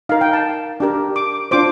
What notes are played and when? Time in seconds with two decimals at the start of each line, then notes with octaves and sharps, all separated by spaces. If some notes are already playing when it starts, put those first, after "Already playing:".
0.09 D#4 A#4 F5
0.21 G5
0.33 A5
0.80 D4 G4 A#4
1.16 D6
1.51 D4 F4 C5 D6